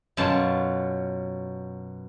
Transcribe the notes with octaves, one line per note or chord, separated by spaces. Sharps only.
F#2 B2 F4 G#5 A5